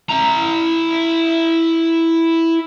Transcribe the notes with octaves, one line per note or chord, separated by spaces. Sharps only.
E4 A#5